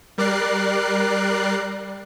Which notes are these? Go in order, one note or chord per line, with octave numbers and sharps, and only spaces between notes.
G3 A#4 D5 F#6 C7